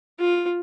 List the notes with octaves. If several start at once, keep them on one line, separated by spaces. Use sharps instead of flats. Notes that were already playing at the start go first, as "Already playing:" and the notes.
F4